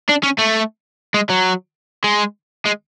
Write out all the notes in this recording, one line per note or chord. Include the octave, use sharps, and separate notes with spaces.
D4
C#4
A3
G#3
F#3
G#3
G#3